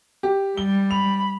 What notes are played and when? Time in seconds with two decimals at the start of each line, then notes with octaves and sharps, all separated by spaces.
0.23 G4
0.57 G3 G7
0.91 B5 F7